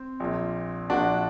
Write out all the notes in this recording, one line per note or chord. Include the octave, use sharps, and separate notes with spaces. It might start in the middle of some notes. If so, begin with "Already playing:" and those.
Already playing: C4
A#1 A#2
A#1 A#2 D4 F#4